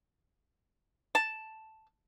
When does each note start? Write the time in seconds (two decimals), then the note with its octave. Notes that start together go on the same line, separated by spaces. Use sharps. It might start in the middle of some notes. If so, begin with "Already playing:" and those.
1.15 A5